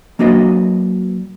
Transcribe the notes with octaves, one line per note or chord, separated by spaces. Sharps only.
F#3 A#3 D4 F#4 B4 D#5